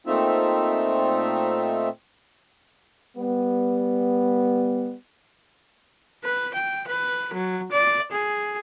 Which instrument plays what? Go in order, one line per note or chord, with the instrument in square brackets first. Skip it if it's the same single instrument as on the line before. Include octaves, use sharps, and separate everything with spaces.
[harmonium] A#2 A3 C4 D#4 F4 E5
[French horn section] G3 B3
[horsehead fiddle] B4
G5
B4
F#3
D5
G#4